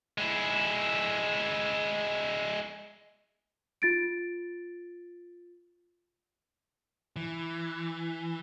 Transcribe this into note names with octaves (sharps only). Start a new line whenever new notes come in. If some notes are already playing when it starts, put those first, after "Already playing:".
G#3 E4
F4 A6 D7
E3